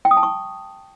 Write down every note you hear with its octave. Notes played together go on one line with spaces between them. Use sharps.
G5
D#6
A5
C#6